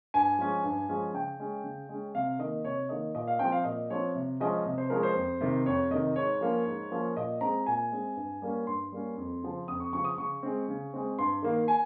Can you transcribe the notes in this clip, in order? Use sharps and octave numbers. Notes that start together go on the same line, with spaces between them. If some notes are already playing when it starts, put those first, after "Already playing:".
G2 G#5
F3 G#3 C#4
G2
F3 G#3 C#4
C#3 G5
G#3 C#4
C#3
G#3 C#4
C3 F5
D#3 A#3 D#5
C3 C#5
D#3 A#3 D#5
A#2 D#5
F5
F3 C4 G5
F5
A#2 D#5
F3 C4 C#5
C3
F3 G#3 C#4 D#5
C3
C5
F3 G#3 C#4 A#4
C5
F2
C3 D#3
F2 C#5
C3 D#3 D#5
G#2 C#5
F3 A#3 C#4
G#2
F3 A#3 C#4
A#2 D#5
G#3 C4 A#5
A#2 G#5
G#3 C4
G2
G3 A#3 C#4
G2 C6
G3 A#3 C#4
F2
C#3 F3
F2 D#6
C#6
C#3 F3 C#6
D#6
C#3 C#6
G#3 C4
C#3
G#3 C4
G2 C6
D#3 A#3
G#5